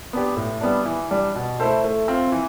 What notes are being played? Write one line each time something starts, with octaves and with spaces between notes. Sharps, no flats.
B3 D4 G4
A2
G3 B3 D4
E3
G3 D4
B2
A3 E4 A4 C5
A3
C4 F4
E3